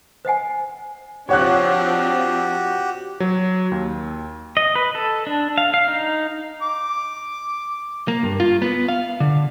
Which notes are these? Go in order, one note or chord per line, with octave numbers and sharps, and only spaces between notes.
C5 D#5 F#5 G#5
F3 C4 D4 F#4 G4 C#5 F#5 F#6
F#3
D#2
D#5
B4
A4
D4
F5
F5
D#4
D6
A#3
G2
F4
B3
F5
D3